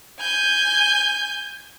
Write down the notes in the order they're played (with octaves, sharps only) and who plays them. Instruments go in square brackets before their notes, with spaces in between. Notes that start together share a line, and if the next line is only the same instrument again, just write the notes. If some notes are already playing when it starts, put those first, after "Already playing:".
[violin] G#5 G6